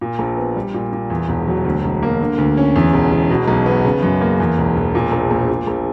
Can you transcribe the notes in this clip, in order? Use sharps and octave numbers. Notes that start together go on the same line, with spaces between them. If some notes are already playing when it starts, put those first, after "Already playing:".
A#2
A#1
B3
G3
A#2
A#2
E2
E1
F#3
D2
E1
A#3
D3
D2
C#4
E2
E1
E1
B2
B1
B3
C#3
F#2
A#3
E2
E1
E1
A#2
A#1
A#1
A#2
A#1